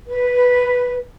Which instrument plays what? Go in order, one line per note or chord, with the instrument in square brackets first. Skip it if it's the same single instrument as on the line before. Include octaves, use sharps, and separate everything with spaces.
[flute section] B4